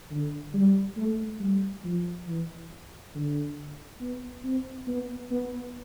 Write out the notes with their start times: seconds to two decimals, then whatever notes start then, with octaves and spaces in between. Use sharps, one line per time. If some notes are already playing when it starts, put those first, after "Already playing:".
0.11 D3
0.54 G3
0.97 A3
1.40 G3
1.84 F3
2.27 E3
3.14 D3
4.01 B3
4.44 C4
4.87 B3
5.30 B3